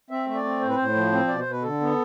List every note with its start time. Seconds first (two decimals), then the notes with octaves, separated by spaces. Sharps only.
0.10 C4 E5
0.27 A3 E5
0.35 D5
0.44 C4
0.61 A2 C5
0.68 B4
0.76 A2 C5
0.95 F3
1.12 C4
1.28 B2 D5
1.39 C5
1.46 B2 B4
1.63 D3 A4
1.81 B3